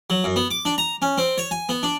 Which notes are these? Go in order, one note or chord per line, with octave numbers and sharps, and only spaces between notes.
F#3
F#2
B3
D6
D4
A#5
C#4
C4
C#5
G#5
B3
D4